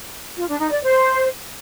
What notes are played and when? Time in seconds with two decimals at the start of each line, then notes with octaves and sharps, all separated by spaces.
0.37 F4
0.48 D4
0.60 D#4
0.71 D5
0.83 C5